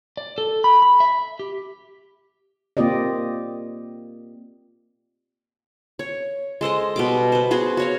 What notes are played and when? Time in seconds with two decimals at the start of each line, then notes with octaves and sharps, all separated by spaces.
0.17 D5
0.38 A4
0.64 B5
0.82 B5
1.00 E5
1.39 G4
2.77 A#3 C4 F4 G4 D5 D#5
5.99 C#5
6.61 G#3 A4 C5 D#5
6.96 B2 G3 D6
7.32 B4 C5
7.51 B3 F#4 G#4 C5
7.77 F#4 C#5 F5